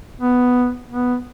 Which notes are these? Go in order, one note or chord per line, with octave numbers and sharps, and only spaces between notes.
B3
B3